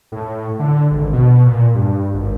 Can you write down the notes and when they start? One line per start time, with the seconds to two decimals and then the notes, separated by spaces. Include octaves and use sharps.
0.12 A2
0.59 D3
0.91 G#1
1.13 B2
1.46 A#2
1.75 G2
2.14 G#1